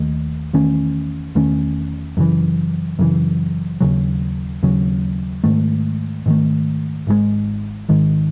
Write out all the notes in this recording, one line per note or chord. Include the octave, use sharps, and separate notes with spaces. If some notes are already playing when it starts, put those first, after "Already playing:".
Already playing: D#2 D#3 A3
E2 D#3 A3 C#4
E2 D#3 A3 C#4
F#2 C#3 E3
F#2 C#3 E3
D#2 C#3 F#3
D#2 C#3 F#3
G#2 D#3 A3
G#2 D#3 A3
G#1 G#2 D#3 G#3
G#1 G#2 D#3 G#3